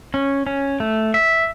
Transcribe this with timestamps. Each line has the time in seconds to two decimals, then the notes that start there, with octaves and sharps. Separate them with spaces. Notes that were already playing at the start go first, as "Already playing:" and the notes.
0.14 C#4
0.46 C#4
0.80 A3
1.14 E5